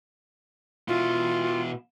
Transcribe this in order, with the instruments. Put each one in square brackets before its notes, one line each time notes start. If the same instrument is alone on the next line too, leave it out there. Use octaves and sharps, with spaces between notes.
[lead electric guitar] B2 E4 [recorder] F4